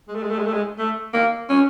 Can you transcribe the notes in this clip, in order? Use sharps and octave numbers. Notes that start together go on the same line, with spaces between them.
G#3
A3
G#3
A3
G#3
A3
G#3
A3
A#3
C#4